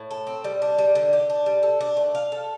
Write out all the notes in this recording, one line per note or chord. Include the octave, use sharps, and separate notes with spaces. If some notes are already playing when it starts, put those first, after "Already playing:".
Already playing: A2
A4
C4
G3
D4
G3
D3
G4
D4
G3
A4
D4
A3
F5
A4